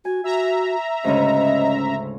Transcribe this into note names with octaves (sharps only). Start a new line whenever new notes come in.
F#4 G#5
F#4 E5 A#5
D2 G#2 C#3 C#4 D#5